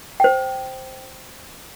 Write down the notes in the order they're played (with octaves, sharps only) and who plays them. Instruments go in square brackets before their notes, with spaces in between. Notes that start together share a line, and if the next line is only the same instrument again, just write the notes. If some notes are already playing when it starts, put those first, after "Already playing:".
[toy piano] C5 G5